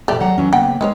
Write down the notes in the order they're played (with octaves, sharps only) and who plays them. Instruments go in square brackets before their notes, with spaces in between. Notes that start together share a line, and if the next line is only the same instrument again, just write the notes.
[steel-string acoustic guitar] B2 F3 D5 [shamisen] A3 G4
[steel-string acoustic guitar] F#3 F#5 A#5
E3 F#3 C#4
[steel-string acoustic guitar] C#3 A#3 B3 [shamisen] F#5 G5
[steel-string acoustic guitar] G#3 [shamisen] D#4 B4 C#5